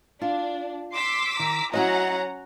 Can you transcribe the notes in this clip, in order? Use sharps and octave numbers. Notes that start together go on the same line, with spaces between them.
D4 F4
C6 D6 E6 B6
D#3 A#5
F#3 C#4 E4 F#4 D#5 F#5 A#5